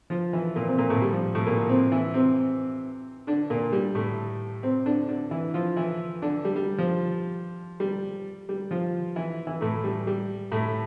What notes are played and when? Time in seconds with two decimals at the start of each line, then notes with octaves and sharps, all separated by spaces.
0.10 F3 F4
0.33 E3 E4
0.56 A#2 A#3
0.68 C3 C4
0.78 A#2 A#3
0.90 A2 A3
1.02 G3
1.13 F3
1.35 A2 A3
1.46 A#2 A#3
1.69 C3 C4
1.92 E3 E4
2.14 C3 C4
3.27 D3 D4
3.50 A#2 A#3
3.72 G3
3.95 A2 A3
4.63 C3 C4
4.86 D3 D4
5.09 D3 D4
5.31 E3 E4
5.54 F3 F4
5.76 E3 E4
6.22 D3 D4
6.45 G3
6.56 G3
6.78 F3
7.80 G3
8.49 G3
8.71 F3 F4
9.16 E3 E4
9.47 E3 E4
9.61 A2 A3
9.84 G3
10.07 G3
10.52 A2 A3